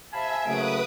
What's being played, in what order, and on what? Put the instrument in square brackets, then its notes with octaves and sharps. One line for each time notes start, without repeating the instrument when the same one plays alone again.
[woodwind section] C3 F5 G#5 [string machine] E5 [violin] A5 B5
[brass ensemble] C#3 F#3 A3 [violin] A#3 D7 [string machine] B4 D#6